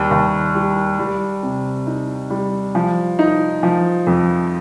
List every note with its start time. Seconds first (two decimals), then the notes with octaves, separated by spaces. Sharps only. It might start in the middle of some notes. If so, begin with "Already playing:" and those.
Already playing: D#2 G3
0.11 D#2
0.55 G3
0.99 G3
1.43 C3
1.87 D#4
2.30 G3
2.75 F3
3.19 D#4
3.63 F3
4.07 F2